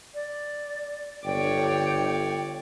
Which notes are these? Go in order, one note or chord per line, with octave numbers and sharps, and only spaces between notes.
D5
G1 C#5 D5 G5